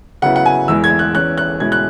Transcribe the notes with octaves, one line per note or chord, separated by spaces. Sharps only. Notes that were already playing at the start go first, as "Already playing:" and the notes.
C#3 F#3 B3 E4 F#5
F#5
G#5
E2 E3 G#3 E4 E6
G#6
F#6
E2 E3 C#4 F#6
F#6
B2 G#3 C#4 E4 G#6
F#6